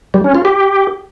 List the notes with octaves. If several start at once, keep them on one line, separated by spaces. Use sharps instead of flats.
G3
C#4
F4
G4